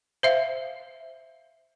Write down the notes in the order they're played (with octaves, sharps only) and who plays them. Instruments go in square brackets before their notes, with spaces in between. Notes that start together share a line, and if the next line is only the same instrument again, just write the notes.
[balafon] C5 E5 F5